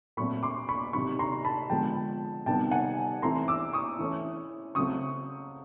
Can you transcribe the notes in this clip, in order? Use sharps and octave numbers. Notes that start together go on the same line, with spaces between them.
A#2 F#3 A3 C4 B5 C#6
C6 D6
B5 C#6
C3 D#3 F#3 B5 C#6
A#5 C6
A5 B5
D3 F3 G#3 B3 G5 A5
C3 D#3 G3 B3 G5 A5
F#5 G#5
E3 A3 C4 A#5 C6
D6 E6
C#6 D#6
E3 A3 C#4
C#3 F#3 A3 C4 C#6 D#6